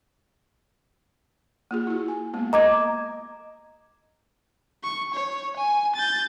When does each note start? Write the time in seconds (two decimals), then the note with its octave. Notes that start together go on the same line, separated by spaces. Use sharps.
1.71 A#3 F4 G#4
1.87 E4 F#4
2.08 G#5
2.34 G#3 A#3 B3
2.53 D#5 A#5 D6 G#6
4.84 C#6
5.14 C#5
5.57 G#5
5.96 G6 A6